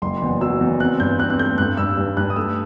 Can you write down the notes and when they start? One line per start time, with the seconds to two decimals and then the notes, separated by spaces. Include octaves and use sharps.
0.02 F#1 C6
0.22 E2
0.41 F#3 E6
0.61 E2
0.80 C4 F#6
1.00 G2 G6
1.19 C4 F#6
1.30 F#6
1.39 A3 G6
1.58 G2 F#6
1.77 G2 E6
1.97 G2
2.17 G2 F#6
2.30 D#6
2.36 A3 E6